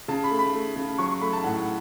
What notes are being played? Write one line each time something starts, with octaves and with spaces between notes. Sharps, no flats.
C#3 A5
B5
A3
B5
A3
C#3
F#3 C#6
C#6
A3 B5
A5
A2 F#5